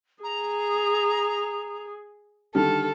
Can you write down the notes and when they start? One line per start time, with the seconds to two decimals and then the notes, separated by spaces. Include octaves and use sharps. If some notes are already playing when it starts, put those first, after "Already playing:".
0.23 G#4 A#5
2.55 D3 D#3 G3 A4 F6